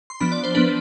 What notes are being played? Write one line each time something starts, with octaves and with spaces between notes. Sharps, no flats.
C6
F3 B3 D4 B5
D5
C5
F3 B3 D4 B4